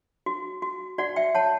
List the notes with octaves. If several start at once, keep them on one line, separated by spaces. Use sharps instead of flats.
F#4
F#4
F#4 D5 F#5
E5 G5
C#5 F#5 A5